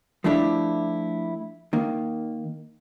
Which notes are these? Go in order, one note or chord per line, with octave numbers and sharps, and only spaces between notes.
F3 A3 D4 E4 G4
D#3 A#3